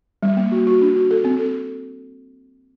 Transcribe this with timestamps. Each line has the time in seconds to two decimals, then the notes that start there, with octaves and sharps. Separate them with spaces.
0.23 G3
0.37 A#3
0.52 F#4
0.67 F#4
0.82 D4
0.96 F#4
1.11 A4
1.25 C4
1.39 A4